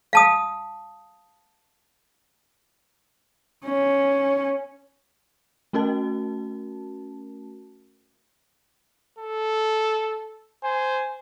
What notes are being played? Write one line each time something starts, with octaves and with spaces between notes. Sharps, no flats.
F5 A5 D#6
C#4
A3 C#4 F#4 A#4 A5
A4
C5 G#5